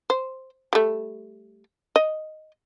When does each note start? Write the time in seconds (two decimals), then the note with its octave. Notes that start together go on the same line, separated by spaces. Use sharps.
0.10 C5
0.73 G3 A3
1.96 D#5